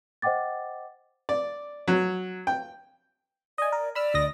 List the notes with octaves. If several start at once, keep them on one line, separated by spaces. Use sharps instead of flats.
C5 D#5 F#5 G5 D6 A6
D5
F#3
G5
D5 D#5 G#5
A#4
D5 B5 E6 F6
D2 D#5 A#6